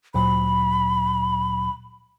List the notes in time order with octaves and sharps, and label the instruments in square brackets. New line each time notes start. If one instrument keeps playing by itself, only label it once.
[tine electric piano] D2 A#2 F#3 [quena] B5